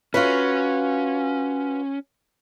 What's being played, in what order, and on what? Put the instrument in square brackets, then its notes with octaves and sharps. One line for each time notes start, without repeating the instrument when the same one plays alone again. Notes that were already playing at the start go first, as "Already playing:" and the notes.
[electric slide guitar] C#4 [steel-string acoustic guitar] F4 F#4 B4